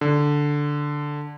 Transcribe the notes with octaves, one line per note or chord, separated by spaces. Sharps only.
D3